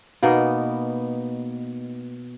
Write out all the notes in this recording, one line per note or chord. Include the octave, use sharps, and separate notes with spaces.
B2 A#3 B3 D#4